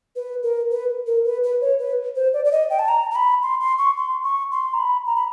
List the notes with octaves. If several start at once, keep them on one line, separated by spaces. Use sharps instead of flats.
B4
A#4
B4
A#4
B4
B4
C#5
B4
C5
D5
D5
D#5
G5
A5
A#5
A#5
B5
C6
C6
C#6
C6
C#6
C6
A#5
B5
A#5
B5